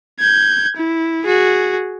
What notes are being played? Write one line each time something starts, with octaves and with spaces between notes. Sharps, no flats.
G6 G#6
E4
F#4 G#4